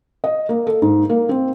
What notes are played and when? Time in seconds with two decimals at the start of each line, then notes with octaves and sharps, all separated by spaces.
0.24 D#5
0.49 A#3
0.67 A4
0.82 G#2
1.10 A#3
1.29 C4